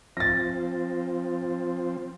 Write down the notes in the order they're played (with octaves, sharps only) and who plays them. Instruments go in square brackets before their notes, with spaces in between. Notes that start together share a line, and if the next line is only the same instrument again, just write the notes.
[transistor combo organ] F3 C4 [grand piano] A6 A#6